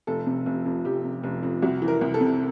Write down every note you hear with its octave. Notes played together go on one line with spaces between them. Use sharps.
F1 A4
C3
F1
F2
F1 G4
C3
F1
F2
C2 F#4
E3
A#4
C2
A4
C3